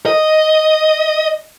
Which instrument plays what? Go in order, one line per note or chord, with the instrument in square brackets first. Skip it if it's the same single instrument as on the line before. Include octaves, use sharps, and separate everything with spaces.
[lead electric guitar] D#5